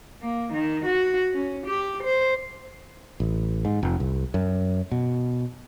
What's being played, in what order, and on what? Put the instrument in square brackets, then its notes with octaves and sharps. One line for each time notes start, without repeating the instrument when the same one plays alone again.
[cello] A#3
D#3
F#4
C#4
G4
C5
[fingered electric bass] A1
G#2
F1
C2
F#2
B2